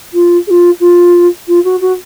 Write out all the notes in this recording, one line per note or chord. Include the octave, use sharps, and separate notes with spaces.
F4
G#4
F4
F4
F4
F#4
F#4